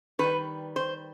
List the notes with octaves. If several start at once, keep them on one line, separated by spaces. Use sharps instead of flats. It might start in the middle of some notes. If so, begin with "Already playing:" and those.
D#3 G3 B4
C5